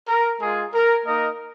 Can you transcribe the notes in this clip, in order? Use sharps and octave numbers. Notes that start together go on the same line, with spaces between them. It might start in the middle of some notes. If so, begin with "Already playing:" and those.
A#4
G#3 F4 G#4
A#4
A#3 D#4 A#4 D#5